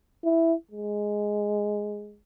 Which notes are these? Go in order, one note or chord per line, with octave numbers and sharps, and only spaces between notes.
E4
G#3